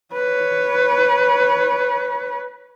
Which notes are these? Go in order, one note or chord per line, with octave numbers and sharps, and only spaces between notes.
B4 C#5